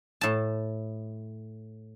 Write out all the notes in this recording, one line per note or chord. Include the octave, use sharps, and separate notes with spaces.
A2 A5